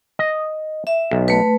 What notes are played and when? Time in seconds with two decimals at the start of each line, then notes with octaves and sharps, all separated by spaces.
0.19 D#5
0.87 E5
1.11 B1
1.28 A3 B4